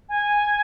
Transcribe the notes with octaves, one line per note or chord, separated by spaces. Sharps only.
G#5